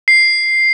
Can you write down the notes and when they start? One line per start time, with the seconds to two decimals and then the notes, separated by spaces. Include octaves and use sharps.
0.08 C7